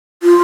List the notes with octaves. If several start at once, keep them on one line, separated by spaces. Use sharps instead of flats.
F4